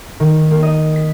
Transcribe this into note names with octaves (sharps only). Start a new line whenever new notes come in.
D#3
A#3
D#5
B6